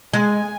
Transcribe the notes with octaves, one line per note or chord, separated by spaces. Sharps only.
G#3 G#5